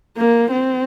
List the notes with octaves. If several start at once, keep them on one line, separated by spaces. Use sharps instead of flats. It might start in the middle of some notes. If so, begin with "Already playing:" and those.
A#3
C4